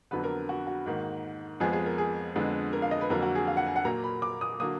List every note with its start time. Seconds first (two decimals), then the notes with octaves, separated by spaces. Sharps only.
0.11 F2 D3 F#3 B3 B4
0.24 A#4
0.49 F#4
0.67 F#4
0.86 G#2 D#3 A#3
1.60 F2 F3 G#3 B3 G#4
1.73 G#4
1.86 A#4
1.98 G#4
2.36 F2 D3 G#3 B3
2.73 A#4
2.82 F5
2.91 D#5
3.01 B4
3.10 F2 D3 F#3 A#3 A#4
3.23 F#4
3.35 G#4
3.47 F5
3.57 F#5
3.66 G#5
3.76 F#5
3.85 A#2 F#3 A#3 A#5
4.04 B5
4.22 D6
4.41 D#6
4.60 D3 F#3 A#3 D#6